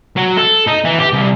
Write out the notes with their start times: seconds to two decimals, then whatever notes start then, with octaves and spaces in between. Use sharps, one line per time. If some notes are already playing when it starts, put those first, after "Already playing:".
0.17 F#3
0.38 A4
0.68 D#4
0.85 E3
0.99 G4
1.13 C2